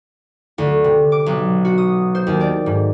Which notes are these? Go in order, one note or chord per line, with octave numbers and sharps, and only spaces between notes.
D2
C3
D6
B1
F#4
D#6
C5
D#2
D5
G#2